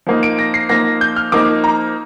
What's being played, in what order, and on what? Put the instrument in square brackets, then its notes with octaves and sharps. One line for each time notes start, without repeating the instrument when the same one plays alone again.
[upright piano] F3 A#3 D#4
D7
A#6
C7
F3 A#3 D#4 A#6
G6
F6
F3 A#3 D#4 D6
A#5